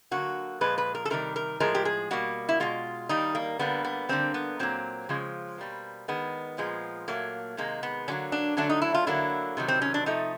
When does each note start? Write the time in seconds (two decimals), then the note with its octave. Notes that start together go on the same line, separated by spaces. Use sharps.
0.11 D3 F#3 A#3 F#4
0.61 A#2 F3 G#3 B4
0.78 B4
0.95 A#4
1.05 A4
1.10 C3 D#3 G3 A#4
1.36 A#4
1.60 A2 F3 G#3 A#4
1.75 G4
1.85 G#4
2.11 B2 G3 A#3 F#4
2.49 E4
2.60 B2 G#3 F4
3.09 D#3 G3 A#3 D#4
3.35 A#3
3.59 D3 G3 A#3 B3
3.85 B3
4.09 D3 G3 A#3 C4
4.34 B3
4.59 A#2 F#3 A#3 C4
5.09 C#3 F3 G#3
5.58 B2 G3 A#3
6.08 D#3 G#3 B3
6.58 A#2 F3 G#3
7.08 A#2 F#3 A3 A#3
7.57 C3 D#3 G#3 A#3
7.83 B3
8.08 D3 F#3 A#3 C#4
8.32 D4
8.57 D3 F#3 A3 D4
8.69 D#4
8.82 E4
8.94 F4
9.07 D3 F#3 A#3 E4
9.57 C3 D#3 F#3
9.68 C4
9.82 C#4
9.94 D4
10.06 C3 F3 A3 D#4